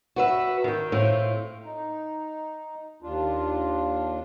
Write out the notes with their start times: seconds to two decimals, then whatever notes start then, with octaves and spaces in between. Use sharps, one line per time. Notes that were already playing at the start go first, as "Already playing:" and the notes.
0.16 F#4 B4 E5
0.64 D#3 G5
0.92 A2 C4 F4
1.65 D#4
3.03 D#2 D4 F4